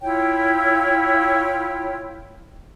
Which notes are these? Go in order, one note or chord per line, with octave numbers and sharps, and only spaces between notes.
E4 F4 C#5 G5